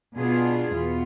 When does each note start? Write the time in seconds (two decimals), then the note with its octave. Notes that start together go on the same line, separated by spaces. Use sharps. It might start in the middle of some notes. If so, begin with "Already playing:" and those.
0.16 B2 B3 D4 F4 G#4
0.73 E2 B2 B3 F4